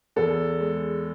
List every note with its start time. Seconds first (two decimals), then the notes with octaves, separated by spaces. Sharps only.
0.16 E2 A4
0.61 G#3